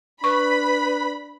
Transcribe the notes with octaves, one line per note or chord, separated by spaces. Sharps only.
D4 B4 B5 C#6